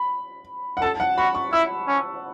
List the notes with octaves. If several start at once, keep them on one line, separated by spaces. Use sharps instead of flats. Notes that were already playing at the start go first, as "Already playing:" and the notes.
Already playing: B5
F#5
A4 A5
F#5
F#4 B5
C#6
E4 E6
C#4